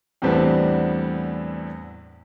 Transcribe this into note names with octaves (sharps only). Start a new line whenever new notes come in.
E2 A2 G3 B3 C4 D4